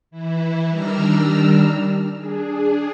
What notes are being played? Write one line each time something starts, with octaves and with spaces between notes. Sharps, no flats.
E3 E4
D#3 G3 D4 A#5 E6 F6
D4 G#4